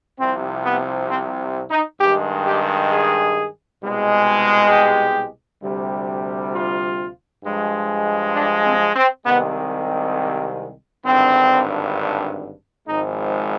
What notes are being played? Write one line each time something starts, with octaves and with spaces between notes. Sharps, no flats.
C2 C3 F3 C4
B3
C4
D#4
G2 D#3 G#3 G4
G4
G#4
C2 B2 G#3
G4
D2 C3 G3
F4
G2 F3 G#3
D4
C4
C4
C2 C3 D#3 G#3 B3
G#1 G2 D3 C4
G#1 G#2 F3 G#3 D#4